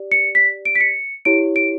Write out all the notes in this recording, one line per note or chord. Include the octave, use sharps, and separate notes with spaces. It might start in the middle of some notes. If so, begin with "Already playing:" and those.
Already playing: G4 D5
C#7
B6
D7
B6
C#7
E4 G4 C#5 D7
D7